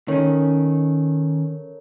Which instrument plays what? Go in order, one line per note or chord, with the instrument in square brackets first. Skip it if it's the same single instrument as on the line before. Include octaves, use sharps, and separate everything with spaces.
[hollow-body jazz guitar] D#3 C#4 [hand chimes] A4 A#4 C#5